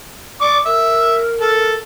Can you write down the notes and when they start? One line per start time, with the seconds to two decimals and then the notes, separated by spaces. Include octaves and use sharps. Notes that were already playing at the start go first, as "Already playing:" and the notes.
0.41 D5 C#6 D6
0.66 A#4 E5
1.41 A4